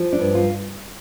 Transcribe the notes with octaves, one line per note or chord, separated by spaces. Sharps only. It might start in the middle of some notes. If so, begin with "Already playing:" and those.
Already playing: F3
D4
G2
F4